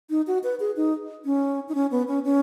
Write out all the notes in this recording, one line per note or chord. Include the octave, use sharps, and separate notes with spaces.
D#4
F#4
B4
G#4
D#4
C#4
D#4
C#4
B3
C#4
C#4